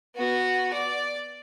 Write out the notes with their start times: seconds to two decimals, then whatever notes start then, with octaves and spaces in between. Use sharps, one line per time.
0.16 B3 F#4
0.73 D5